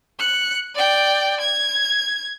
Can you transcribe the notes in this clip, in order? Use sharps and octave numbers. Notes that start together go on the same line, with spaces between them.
F#6 C#7
D5 G5
G#6